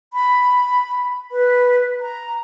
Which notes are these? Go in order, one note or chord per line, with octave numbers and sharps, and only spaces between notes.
B5
B4
A#5